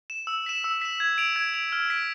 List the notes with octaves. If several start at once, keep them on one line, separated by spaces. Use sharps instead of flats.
E7
E6
B6 E7
E6
B6 E7
G#6
D7 F7
G#6
D7 F7
F6
B6 D7